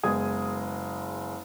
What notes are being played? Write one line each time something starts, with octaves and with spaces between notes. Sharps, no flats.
F#1 G#3 B3 D#6 G#6